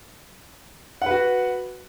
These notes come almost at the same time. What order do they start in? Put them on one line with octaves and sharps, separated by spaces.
F#5 B4 F#4